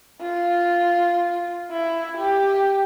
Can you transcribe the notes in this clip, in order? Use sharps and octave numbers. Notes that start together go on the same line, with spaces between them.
F4
E4
G4